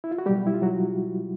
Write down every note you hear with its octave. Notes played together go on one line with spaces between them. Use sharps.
E4
F4
F#4
B2 F#3 G3 G4
E4
F4
F#3 F#4